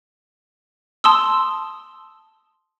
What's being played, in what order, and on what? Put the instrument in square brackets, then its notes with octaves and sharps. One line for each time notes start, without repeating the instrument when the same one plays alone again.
[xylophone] A5 C6 D#6 E6